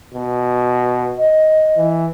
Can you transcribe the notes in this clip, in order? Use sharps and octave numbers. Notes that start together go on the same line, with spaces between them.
B2
D#5
E3